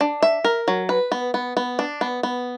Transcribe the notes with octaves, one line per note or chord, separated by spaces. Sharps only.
D4
E5
A#4
F#3
B4
B3
B3
B3
D4
B3
B3